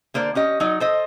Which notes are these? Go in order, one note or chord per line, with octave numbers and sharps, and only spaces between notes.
D3 A#3 C5 D5
C#4 G4 D#5
F#3 D#4 D5
A4 C5 D#5